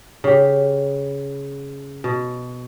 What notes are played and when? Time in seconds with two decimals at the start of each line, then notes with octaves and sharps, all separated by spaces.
0.24 C#3 G4
2.04 B2